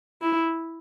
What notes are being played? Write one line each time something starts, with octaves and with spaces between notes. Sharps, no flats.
E4